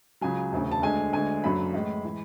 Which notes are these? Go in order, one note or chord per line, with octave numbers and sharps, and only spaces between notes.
C#2 C#3 F#3 G#5
E1 D2 C#3
A5
D2 D3 G#3 G#5
D2 D3 G#3 G#5
F#1 F#2 D3 F#3 B5
A1 A2 G#3
E3 G#3